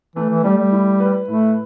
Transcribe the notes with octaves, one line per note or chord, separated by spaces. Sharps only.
E3 A3
E3
G3 A3
G3
E4
B4
A2 A3